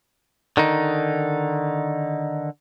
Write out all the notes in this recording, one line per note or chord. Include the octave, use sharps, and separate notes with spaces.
D3 D#3 D#4